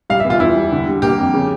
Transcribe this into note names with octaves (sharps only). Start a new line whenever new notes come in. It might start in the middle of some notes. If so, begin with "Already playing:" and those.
G3 F5
E5
E2
F4
E2 E4
G3
D3
G3
A#3 G4
F2
C#3